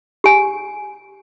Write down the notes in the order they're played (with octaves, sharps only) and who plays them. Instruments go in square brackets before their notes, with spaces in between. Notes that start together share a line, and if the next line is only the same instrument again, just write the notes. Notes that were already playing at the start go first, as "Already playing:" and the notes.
[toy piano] G4 G#5